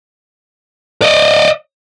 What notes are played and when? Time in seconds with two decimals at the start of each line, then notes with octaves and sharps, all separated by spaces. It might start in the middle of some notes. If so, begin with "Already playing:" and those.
1.02 D5 D#5